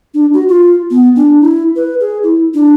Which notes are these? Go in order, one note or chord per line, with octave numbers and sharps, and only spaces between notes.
D4
F#4
F4
B3
D4
E4
B4
G#4
E4
D4